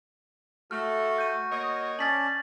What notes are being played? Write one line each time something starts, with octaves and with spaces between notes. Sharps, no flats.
A3 F#4 F6
G6 D#7
A#3 C#5 D#5
C#4 D5 A5 A6 B6 F#7